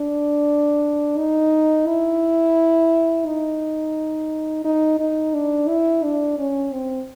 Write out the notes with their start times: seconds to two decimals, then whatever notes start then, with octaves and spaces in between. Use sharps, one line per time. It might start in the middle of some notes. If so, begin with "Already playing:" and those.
Already playing: D4
1.18 D#4
1.87 E4
3.26 D#4
4.64 D#4
4.99 D#4
5.34 D4
5.68 E4
6.03 D4
6.38 C#4
6.73 C4